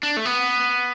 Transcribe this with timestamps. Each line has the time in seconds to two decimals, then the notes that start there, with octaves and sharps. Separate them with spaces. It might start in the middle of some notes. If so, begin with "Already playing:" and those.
0.03 D4
0.17 A3
0.26 B3